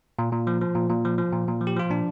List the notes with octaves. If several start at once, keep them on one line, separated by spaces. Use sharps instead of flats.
A#2
A#2
F3
F3
A#2
A#2
F3
F3
A#2
A#2
F3
G4
F3 F4
A#2 D4